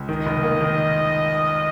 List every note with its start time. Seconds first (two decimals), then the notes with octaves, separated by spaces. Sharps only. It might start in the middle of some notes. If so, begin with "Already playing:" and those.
Already playing: C#2
0.09 D#3 D#5
0.26 F1
0.43 A#3
0.61 D#3